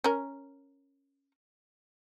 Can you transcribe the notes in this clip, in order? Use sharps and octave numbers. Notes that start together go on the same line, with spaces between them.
C#4 A#4